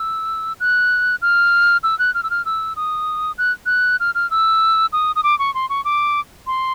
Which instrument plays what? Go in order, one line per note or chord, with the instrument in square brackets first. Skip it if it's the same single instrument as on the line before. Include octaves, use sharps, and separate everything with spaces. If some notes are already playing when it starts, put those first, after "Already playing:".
Already playing: [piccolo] E6
F#6
F6
E6
F#6
F6
E6
F6
E6
D#6
F#6
F#6
F6
F6
E6
D#6
D#6
D6
C#6
C6
C#6
D6
C6